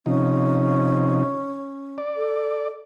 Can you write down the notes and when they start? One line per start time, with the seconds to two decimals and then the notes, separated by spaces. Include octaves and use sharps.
0.06 C3 F3 C#4 D#4
1.98 D5
2.16 A4